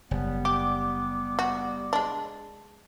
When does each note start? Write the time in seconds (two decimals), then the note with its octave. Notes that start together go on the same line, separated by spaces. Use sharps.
0.11 F#1 G3 B3
0.45 G4 D6
1.39 F#4
1.93 G#3 D4